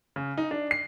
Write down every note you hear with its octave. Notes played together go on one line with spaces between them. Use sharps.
C#3
D#4
D4
C7